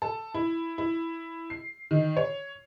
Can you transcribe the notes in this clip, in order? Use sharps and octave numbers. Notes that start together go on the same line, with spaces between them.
A4
E4
E4
C7
D#3
C#5